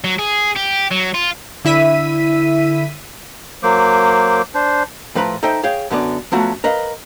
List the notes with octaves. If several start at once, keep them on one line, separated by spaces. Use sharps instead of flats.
F#3
G#4
G4
F#3
F4
D3 E4 E5 B6 D#7
F#3 A#3 C5 D6
D4 C5
A2 F3 B4 A#5 B5
D#4 A4 C5 E5 G5
G#4 C#5 F5 G5
F#2 D3 B3 D5
F3 F#3 A3 B3 C#4 F#4
A#4 B4 D#5 F5